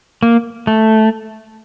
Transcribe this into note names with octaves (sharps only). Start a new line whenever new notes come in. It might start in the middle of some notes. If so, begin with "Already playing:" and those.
A#3
A3